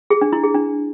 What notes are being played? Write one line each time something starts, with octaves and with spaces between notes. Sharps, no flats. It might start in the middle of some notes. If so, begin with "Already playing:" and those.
G#4
D4
E4
G#4
D4